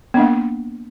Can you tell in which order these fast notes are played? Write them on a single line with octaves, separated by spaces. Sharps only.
B3 D4 A#3